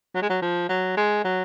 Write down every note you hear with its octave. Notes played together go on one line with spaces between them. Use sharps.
F#3
G#3
F#3
F3
F#3
G#3
F#3